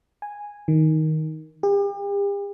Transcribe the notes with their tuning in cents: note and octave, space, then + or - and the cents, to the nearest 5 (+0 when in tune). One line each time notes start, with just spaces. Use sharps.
G#5 -5
D#3 +10
G4 +40